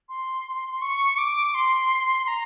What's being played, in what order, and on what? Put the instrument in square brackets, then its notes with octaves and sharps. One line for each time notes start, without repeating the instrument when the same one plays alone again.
[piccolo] C6
C#6
D6
C6
A#5